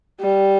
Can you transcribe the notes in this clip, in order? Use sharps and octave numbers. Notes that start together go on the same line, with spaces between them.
G3